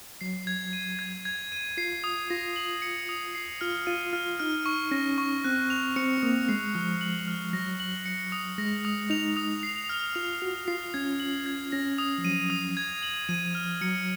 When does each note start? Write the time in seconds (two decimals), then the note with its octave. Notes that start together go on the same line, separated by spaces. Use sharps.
0.21 F#3 C7
0.47 G#6
0.73 D#7
0.99 G#6
1.25 G#6
1.52 D#7
1.77 F4 C7
2.04 D#6
2.30 F4 A#6
2.56 F#7
2.82 C#7
3.09 D#6
3.35 C7
3.61 F4 F6
3.87 F4 D#7
4.13 F4 F6
4.40 D#4 F6
4.66 C#6
4.91 C#4 A#6
5.18 C#6
5.44 C4 F#6
5.70 F7
5.96 C4 C#7
6.18 C4
6.22 A#3 D#6
6.49 G#3 C7
6.75 F3 F6
7.01 F#7
7.27 F6
7.53 F#3 A#6
7.80 F#7
8.06 C#7
8.32 D#6
8.58 G#3 A#6
8.85 D#6
9.10 D#4 F7
9.37 D#6
9.63 C7
9.89 F6
10.15 F4 F7
10.42 F#4 F6
10.68 F4 C7
10.94 C#4 G#6
11.20 F#7
11.46 G#6
11.72 C#4 A#6
11.98 D#6
12.18 F3
12.25 F#3 D#7
12.50 D#6
12.77 G#6
13.03 F#7
13.29 F3 D#7
13.55 F6
13.81 F#3 C#7